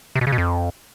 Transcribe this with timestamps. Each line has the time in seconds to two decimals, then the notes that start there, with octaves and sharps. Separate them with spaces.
0.15 C3
0.21 B2
0.27 C#3
0.32 B2
0.38 F2